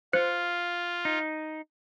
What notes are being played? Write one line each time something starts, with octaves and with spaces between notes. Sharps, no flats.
F4 C5 F#6 C#7
D#4